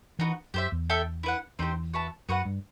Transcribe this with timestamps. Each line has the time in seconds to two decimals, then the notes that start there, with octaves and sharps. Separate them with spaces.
0.19 E3 B3 D#4 F#4 B4
0.54 F#2 G4 C5 E5
0.72 E2
0.90 E4 A4 E5 G5
1.23 E4 B4 F#5
1.59 E2 C4 D#4 G4 C5
1.94 F#4 B4 E5 A5
2.29 F#2 B3 F#4 B4 F#5
2.45 G2